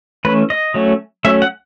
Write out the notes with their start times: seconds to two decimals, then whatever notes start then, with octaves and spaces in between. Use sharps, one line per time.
0.25 E3 A3 C#4 B4
0.50 D#5
0.74 F#3 A3 C#4
1.24 F#3 A3 C#4 E5
1.42 F#5